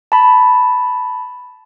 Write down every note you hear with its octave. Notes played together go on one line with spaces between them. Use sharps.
A5 B5